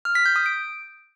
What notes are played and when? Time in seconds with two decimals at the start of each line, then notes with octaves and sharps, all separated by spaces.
0.05 F6
0.15 B6
0.26 G6
0.36 D#6
0.46 D7